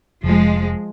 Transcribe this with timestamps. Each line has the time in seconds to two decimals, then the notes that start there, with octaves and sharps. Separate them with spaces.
0.24 F1 F3 G#3